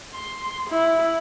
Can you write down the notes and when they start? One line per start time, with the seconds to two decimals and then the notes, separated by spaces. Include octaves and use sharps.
0.14 C6
0.70 E4